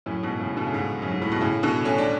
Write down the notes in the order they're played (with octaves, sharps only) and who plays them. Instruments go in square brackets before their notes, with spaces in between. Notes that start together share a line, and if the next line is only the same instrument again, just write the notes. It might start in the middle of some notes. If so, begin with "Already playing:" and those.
[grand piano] F#2 A2
G#2 B2
A2 C#3
B2 D3
C#3
G#2 B2
F#2
G#2
A2
B2
A2 C#3
B2 D3
A3 C#4
D4